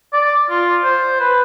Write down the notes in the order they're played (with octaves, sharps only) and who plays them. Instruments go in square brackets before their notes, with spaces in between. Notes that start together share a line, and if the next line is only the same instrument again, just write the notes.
[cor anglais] D5
F4
C5
B4